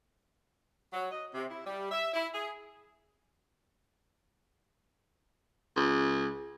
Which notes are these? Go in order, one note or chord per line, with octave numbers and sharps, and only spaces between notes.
F#3
D#5
C3
E4
G3
E5
E4
G#4
C#2